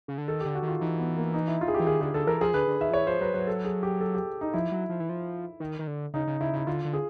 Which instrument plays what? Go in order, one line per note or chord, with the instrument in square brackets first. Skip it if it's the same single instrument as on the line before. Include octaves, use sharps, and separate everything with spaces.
[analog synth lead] C#3
D3
[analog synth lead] D#3 [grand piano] A4
[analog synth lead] D3 [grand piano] G4
[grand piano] F#4
[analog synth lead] D#3
[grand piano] F4
[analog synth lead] E3 [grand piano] D#4
[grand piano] B3
A#3
D#4
E4
F4
G#4
G4
[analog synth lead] E3
[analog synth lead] D#3 [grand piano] G#4
[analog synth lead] D3 [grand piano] G#4
[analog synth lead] D3 [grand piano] A4
[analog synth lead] E3 [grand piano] A#4
[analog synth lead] F3 [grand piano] G#4
[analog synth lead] D3 [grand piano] B4
[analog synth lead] D3
[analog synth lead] D#3 [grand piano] E5
[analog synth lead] F3
[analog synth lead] E3 [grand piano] C#5
[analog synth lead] F3 [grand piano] C5
[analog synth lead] F#3 [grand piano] B4
[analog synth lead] F#3 [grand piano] B4
[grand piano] A4
G#4
G4
A4
G4
D#4
[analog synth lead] F3 [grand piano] E4
[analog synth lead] F#3
F3
E3
F3
D#3
D#3
D3
[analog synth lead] C#3 [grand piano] D#4
[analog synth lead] C#3
[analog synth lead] C#3 [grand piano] E4
[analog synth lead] C#3 [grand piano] E4
[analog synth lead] D3 [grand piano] F4
[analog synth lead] D3
[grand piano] G#4